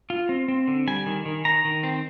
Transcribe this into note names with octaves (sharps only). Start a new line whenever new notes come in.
F4
C4
C4
D3
G3 G#5
D#3
D#3
D#3 A#5
D#3
C4